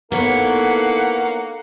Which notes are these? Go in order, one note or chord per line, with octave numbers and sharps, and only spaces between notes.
A#3 B3 D#4 E4 A4 C#5 F#5